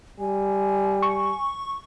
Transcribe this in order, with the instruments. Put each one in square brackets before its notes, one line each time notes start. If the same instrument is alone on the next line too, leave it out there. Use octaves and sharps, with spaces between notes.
[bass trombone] G3 [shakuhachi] G#5
[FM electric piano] C#6